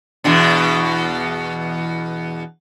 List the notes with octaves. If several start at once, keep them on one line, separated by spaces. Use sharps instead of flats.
E2 B2 D4